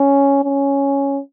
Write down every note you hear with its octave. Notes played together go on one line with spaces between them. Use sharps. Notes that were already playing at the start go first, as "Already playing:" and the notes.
Already playing: C#4
C#4